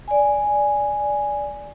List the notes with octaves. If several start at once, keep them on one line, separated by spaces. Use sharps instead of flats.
D5 G#5